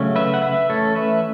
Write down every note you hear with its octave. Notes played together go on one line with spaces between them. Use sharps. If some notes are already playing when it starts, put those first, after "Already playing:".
Already playing: C#3 F#3 A3 C#4
B4 E5
F#5
B4 E5
E3 A3 C#4 A4 C#5
B4 E5